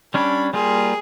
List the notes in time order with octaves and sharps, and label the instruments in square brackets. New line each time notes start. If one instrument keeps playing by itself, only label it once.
[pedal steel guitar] G3 C#4 D4 [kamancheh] B5
[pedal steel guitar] G3 A#3 F4 [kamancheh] G#4